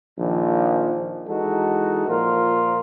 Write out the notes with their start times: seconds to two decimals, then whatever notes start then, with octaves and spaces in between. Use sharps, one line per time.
0.19 A#1 D#3 F3
1.28 E3 G#3 D#4 F#4 A4
2.08 A#2 F3 F4 A#4